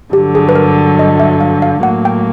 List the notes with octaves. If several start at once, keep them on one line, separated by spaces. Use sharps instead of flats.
G2 D3 F#3 G4
G#4
B4
A#4
D#5
E5
F5
F5
A2 F#3 A#3 F#5
G5